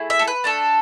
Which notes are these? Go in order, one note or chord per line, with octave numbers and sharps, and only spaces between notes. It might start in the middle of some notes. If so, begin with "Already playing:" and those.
Already playing: A3 E4 G#4
E5
A4
B4
A3 D4 A4